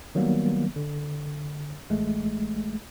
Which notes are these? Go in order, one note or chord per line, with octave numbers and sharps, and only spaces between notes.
D#3 F#3 G3 A#3 B3
D3
A1 G#3 A3